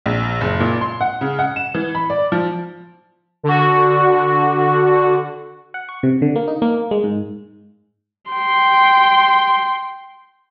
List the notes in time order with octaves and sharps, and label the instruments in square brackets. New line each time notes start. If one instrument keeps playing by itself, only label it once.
[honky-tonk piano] A#1
F#1
A#2
C6
F#5
C#3
F#5
E7
E3
B5
D5
F3
[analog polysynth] D3 F#4
[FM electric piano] F#5
C#6
C3
D3
A#3
D#4
A#3
G#3
G#2
[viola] G5 C6